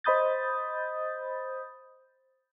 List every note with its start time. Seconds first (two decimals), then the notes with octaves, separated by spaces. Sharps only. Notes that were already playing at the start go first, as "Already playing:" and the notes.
0.04 C5 D#5 B5 D#6 G6 A6